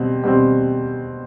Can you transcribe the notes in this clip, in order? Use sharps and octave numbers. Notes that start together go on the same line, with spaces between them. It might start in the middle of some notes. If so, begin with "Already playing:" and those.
Already playing: B2 G3 C4
B2 G3 C4